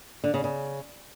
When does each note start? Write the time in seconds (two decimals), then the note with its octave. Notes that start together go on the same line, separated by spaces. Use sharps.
0.24 D3
0.34 C#3
0.44 C#3